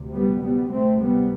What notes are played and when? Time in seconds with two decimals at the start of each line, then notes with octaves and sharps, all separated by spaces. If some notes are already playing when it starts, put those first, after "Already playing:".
Already playing: D2 C3
0.13 G3 B3
0.41 G3 B3
0.71 D2 C3 A3 C4
1.00 G3 B3